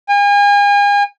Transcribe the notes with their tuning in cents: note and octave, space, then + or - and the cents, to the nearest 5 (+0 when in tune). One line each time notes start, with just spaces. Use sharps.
G#5 -40